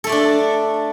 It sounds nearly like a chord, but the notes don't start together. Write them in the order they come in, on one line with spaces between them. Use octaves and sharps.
A4 A3 D5 D4